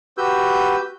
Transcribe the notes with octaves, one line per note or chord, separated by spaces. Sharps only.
F#4 G4 B4 E6 G6